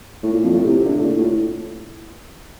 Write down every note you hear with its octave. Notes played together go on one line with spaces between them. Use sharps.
A2
A#2
F2
A2
C3
D3
A2
A#2
A2